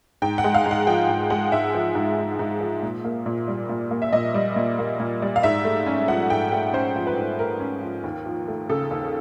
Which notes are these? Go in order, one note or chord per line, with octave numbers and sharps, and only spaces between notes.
G#2 G5
F#5
G#3
F5
G#2
F#5
F3 G5
G#2
G#3 F#5
G#2 E5
F3
G#2
G#3
G#2
F3
A#2
A#3
A#2
G3
A#2
A#3
E5
A#2 D#5
G3
A#2
A#3
A#2
G3
F5
G#2 E5
A3
C#4
F3 F#5
G#2 G5
A3 F#5
C#4 C5
F3
B4
G#2
A3 A#4
C#4
F3
D#2
F3
A3
C#3 A4
D#2